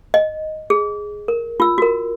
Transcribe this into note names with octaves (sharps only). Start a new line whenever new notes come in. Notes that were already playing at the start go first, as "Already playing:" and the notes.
D#5
G#4
A#4
F4 E6
F#4 A#4